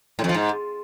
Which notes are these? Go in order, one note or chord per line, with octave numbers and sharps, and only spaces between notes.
A2
F2
F3
G#2